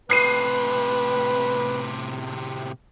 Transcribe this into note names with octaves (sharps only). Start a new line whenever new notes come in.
A2 C3 B4 F#6 C7 D#7